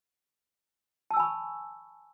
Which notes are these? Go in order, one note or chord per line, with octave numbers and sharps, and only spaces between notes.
G#5 A5 B5 C#6 E6